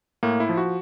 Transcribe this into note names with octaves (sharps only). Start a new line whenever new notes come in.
A2 A#3
E4
F3
F#4